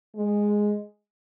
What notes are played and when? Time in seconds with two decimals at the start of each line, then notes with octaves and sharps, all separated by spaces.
0.16 G#3